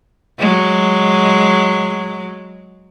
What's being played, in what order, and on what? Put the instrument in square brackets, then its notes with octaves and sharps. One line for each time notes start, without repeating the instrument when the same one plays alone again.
[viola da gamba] F#3 G#3